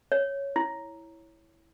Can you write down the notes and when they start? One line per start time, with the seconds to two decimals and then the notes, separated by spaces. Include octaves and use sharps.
0.12 C#5
0.56 E4